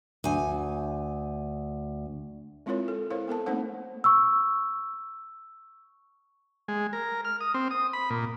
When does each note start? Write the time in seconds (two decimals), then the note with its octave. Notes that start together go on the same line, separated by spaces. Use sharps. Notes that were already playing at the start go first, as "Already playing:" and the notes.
0.24 D2 G#5
2.66 G#3 C4 E4 F4 A#4 C#5
2.88 A4
3.10 E4 A#4 C5 C#5 F5
3.28 B3 A4 A#4 A5
3.46 A3 A#3 C4 D#4 C5 F#5
4.04 C#6 E6
6.68 G#3
6.93 A#4
7.25 F6
7.41 D#6
7.54 C4
7.71 D#6
7.93 B5
8.10 A#2